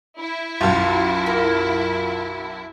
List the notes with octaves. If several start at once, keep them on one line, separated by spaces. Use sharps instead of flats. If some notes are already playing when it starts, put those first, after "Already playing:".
E4
B1 F#2 F4 G6
A#3 A4 A#4